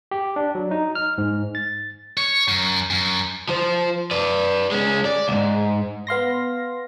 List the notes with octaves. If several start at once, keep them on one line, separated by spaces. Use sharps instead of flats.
G4
D4
F#3
D#4
F6
G#2
A6
C#5
F#2
F#2
F3 C5
B4 D5
G#3 C#4
D5
C#2 G#2
B3 F5 C6 A#6